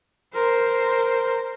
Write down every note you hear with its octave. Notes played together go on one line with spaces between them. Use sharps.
A#4 C5